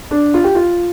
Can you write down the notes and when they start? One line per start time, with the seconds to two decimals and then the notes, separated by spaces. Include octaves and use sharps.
0.11 D4
0.34 F4
0.44 G4
0.55 F4